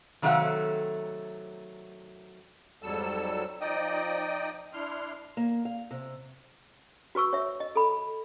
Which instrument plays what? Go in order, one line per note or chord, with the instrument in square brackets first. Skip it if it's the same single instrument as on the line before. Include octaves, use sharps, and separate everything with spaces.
[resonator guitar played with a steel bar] C3 D#3 F#3 A3 F5 F#5
[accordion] F2 G#2 F#3 G3 A4 E6
F3 D#4 D5 D#5 G5 D#6
D4 E4 C6 F6
[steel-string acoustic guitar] A#3
F5
C3
[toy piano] F#4 B4 C#6 E6
C#5 E5
D#5
A4 B5